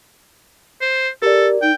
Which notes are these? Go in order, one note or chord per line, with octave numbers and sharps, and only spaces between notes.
C5
G4 A4 A#4 D5
D#4 G5